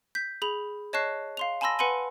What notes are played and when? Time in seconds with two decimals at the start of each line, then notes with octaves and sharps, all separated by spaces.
0.15 G6 B6
0.42 G#4 B5 F7
0.93 C#5 D#5 A5 C#6 F#6 C7
1.37 F5 C6 F7
1.61 G#5 A5 B5 C6 E6 A#6
1.79 B4 F#5 G#5 B5 C6 D#7